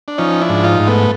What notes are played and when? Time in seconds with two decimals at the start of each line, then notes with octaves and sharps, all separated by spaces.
0.08 D4
0.18 F3 C#4 D#4
0.41 D4 E4
0.49 G#2
0.64 D#4 F4
0.80 G#2
0.87 A3 B3